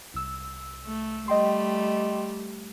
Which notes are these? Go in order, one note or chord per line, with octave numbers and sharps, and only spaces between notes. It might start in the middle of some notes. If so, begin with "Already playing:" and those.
C2 E6
A3
G3 A3 D#5 G5 C6